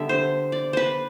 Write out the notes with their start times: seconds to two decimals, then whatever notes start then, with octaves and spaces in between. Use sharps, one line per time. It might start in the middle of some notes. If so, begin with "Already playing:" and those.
Already playing: D3 G3 B3 E5
0.09 C5
0.52 D5
0.73 B4 C5